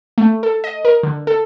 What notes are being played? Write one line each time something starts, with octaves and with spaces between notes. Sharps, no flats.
A3
A4
D#5
A#4
D3
A4